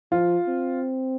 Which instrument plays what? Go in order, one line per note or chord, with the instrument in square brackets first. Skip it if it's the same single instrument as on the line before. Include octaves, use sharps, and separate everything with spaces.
[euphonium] F3 [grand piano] F4
[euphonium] C4